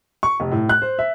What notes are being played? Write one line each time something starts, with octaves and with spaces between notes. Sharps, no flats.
C#6
F1
A2
F#6
C5
E5